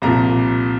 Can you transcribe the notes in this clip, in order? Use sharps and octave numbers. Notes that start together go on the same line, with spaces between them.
C2 A#2 F3 A#5